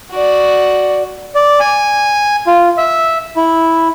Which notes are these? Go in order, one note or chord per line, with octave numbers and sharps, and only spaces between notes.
F#4 D5
D5
G#5
F4
E5
E4